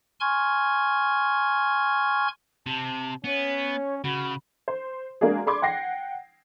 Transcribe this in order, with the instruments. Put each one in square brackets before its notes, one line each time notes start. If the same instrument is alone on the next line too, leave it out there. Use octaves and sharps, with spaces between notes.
[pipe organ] G#5 C6 C#6 F6 G#6
[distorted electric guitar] C3 [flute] A5
[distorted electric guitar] B3 [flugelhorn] C#4 [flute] C#5
[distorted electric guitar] C#3 [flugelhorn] F#4 [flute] B5
[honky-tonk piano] C5
G#3 A#3 D4 F#4 G#4
G#4 D5 B5 C6 D6 G#6
F#5 G5 A#6 C7